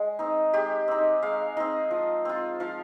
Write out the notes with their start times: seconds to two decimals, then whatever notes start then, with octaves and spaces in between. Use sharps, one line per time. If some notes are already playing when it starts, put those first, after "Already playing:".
Already playing: G#3
0.19 C4 D#4
0.53 G#3 G4
0.88 C4 D#4
1.23 G#3 F5
1.57 C4 D#4 D#5
1.91 F3
2.25 C4 F4
2.60 F3 F5